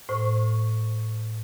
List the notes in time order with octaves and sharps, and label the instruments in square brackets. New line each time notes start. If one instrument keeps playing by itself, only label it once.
[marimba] A2 [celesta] C5 C#6